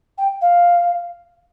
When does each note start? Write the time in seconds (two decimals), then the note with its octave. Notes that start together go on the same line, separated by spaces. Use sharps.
0.18 G5
0.41 F5